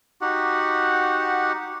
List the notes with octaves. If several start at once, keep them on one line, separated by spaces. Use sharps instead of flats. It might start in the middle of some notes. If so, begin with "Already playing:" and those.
D#4 F#4 G4 F#5